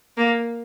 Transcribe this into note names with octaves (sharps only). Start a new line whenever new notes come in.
A#3